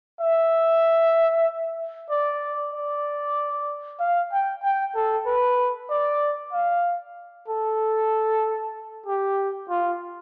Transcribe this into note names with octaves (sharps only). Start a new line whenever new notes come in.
E5
D5
D5
F5
G5
G5
A4
B4
D5
F5
A4
G4
F4